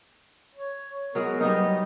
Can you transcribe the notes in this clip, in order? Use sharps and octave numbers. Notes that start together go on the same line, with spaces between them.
C#5
F#3 G#3 B3 A#4
F#3 G3 B3 D#4 D#5